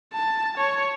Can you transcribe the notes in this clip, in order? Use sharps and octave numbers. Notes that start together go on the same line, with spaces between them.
A5
C#5